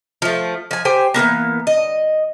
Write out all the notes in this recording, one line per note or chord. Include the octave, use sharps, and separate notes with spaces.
F3 A3
F3 G#5
G4 C5 G5 G#5
E3 F3 A#3 B3
D#5